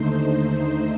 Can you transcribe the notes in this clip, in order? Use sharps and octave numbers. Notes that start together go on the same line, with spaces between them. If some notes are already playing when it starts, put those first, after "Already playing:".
Already playing: D#2 D3 A3 D#4 C5